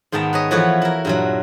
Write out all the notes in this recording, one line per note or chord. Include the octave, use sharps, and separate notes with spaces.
G#2 D#3 B3 G5 A5 A#5
B4 C#5 D#5
E3 F3 A3 F#4 B4 C#5
E4 A#4
G2 A#2 F#3